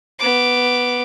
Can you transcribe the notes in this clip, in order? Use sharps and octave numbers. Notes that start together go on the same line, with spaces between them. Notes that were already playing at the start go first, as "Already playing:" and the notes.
B3 D6